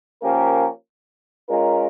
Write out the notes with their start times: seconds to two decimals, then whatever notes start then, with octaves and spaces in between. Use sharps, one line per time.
0.22 F3 A#3 C#4 G4 A#4
1.48 G#3 C#4 F4 A#4